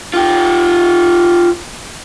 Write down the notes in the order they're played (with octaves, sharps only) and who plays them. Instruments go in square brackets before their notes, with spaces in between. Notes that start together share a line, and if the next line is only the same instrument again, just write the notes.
[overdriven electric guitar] F4 G4